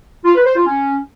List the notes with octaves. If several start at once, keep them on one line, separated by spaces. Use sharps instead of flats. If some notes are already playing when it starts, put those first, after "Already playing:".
F4
B4
C5
F4
C#4